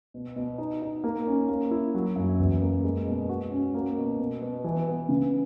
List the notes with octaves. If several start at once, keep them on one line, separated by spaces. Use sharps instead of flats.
B2
B2
D#4
D#4
A#3
C#4
A#3
E4
F#3
F#2
E2
A#3
G#3
B2
F#4
C#4
A#3
B2
B2
B2
E3
B3
C#3